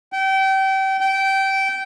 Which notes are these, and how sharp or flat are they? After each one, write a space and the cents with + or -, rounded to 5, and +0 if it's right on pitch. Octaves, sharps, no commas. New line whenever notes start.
G5 -30
G5 -20